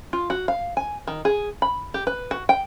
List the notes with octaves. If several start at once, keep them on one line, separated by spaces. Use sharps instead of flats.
F4
F#4
F5
G#5
D#3
G#4
B5
G4
B4
F#4
G5